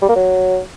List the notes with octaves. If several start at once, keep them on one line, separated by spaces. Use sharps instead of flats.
G3
A#3
F#3